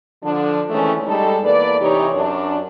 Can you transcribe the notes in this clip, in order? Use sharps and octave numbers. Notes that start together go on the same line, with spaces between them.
D3 F3 D4
D#3 E3 G#3 A3 C4 C#4
G3 G#3 D#4 A4
E2 A#3 B4 D5
C3 E3 D#4 G4 C#5
F#2 D4